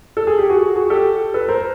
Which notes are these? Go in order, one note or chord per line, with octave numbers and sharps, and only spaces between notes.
A4
G#4
G4
F#4 G#4
F#4 G#4
G4 A4
A4 B4
A#4 C5